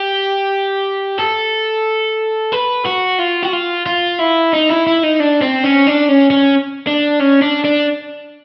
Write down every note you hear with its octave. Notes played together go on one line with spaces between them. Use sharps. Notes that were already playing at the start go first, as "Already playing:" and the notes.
Already playing: G4
A4
B4
F#4
F4
F#4
F4
F4
E4
D#4
E4
E4
D#4
D4
C4
C#4
D4
C#4
C#4
D4
C#4
D4
D4